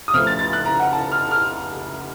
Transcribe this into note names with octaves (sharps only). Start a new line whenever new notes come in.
D#6
C#2 C#3 F3 A3 F6
A6
A6
F#6
A#5
F#5
A5
F6
F6